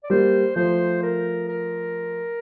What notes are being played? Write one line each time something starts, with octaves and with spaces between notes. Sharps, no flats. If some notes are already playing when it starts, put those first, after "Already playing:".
D5
G3 A#3 C5
F3 A3 C5
A#4
A#4